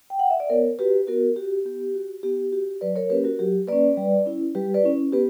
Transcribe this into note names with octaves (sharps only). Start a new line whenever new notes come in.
G5
F#5
E5
D5
B3 A#4 C#5
F#4 G4 B4
B3 F#4 A#4
F#4 G4
B3 G4
F#4
B3 G4
F#4 G4
F#3 B4 D5
A#4 C#5
A#3 C#4 G4 B4
F#4 A#4
F#3 G4
A#3 C#4 B4 D5
G3
C#4 E4
G3 G4 B4
B4 D5
C#4 E4
B3 G4 B4